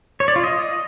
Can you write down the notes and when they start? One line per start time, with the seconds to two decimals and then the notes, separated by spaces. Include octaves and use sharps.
0.20 C#5
0.28 D5
0.36 F4
0.44 D#5